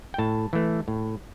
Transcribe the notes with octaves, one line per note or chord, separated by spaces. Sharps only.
G5
A2 A5
E3 A3
A2